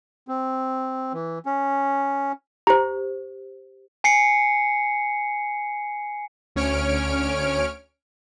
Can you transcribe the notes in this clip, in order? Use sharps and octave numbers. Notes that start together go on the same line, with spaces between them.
C4
E3
C#4
G4 C5 A#5
G#5 C7 C#7
D2 C#4 C#5 F6 D7